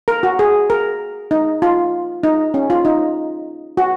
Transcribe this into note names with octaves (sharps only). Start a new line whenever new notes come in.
A#4
F#4
G#4
A#4
D#4
F4
D#4
C#4
F4
D#4
F#4